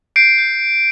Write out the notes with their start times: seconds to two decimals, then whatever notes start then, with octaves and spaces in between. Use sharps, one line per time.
0.16 G6 C7 D7
0.38 G6